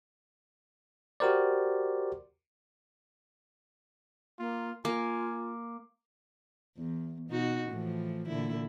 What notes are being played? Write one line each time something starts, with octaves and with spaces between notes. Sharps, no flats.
F#4 G4 A#4 C5 D5
A#3 F4
A#3 F4 G#5 D6
E2
B2 D#4 F#4
A2 E3 F3
A#2 D3 E4